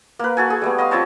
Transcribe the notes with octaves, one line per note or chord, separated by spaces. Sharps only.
A#3 B4
F#4 A4 G#5
G#4
G3 A3 B3
D#5 F5 C6
F3 C4 C#5 A5